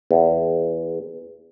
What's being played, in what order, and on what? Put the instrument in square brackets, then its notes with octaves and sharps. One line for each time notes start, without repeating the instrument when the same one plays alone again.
[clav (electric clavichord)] E2